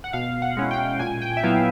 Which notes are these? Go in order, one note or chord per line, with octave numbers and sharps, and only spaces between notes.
F#5
B2 F5
F#5
G#3 C#4 E4
G5
A#2 G#5
G5
E5
F#3 B3 E4 F5